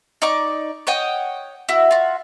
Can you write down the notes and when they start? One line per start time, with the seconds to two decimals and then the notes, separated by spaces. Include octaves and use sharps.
0.22 D#4 D5 C#6 D6
0.87 C#5 D#5 F#5 G5
1.69 E4 F#4
1.91 F4 F#4